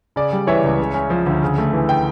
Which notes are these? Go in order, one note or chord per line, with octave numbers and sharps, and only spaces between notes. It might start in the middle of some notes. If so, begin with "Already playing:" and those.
C#3 D5
G3
E3 C#5 E5
C#2
C#3
C#4
F3
D2
C#3
A3
E3
G5